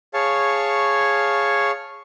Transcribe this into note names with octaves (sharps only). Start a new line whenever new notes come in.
G#4 C#5 F5 A5 C#6